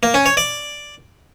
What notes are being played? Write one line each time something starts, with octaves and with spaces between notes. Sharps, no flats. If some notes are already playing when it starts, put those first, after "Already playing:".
A#3
C#4
C#5
D5